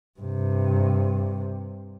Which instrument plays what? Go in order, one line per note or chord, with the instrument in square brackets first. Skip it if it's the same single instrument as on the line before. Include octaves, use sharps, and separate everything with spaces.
[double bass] G2 C3